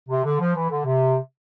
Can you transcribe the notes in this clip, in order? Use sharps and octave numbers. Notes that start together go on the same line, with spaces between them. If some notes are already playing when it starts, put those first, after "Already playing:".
C3
D3
F3
E3
D3
C3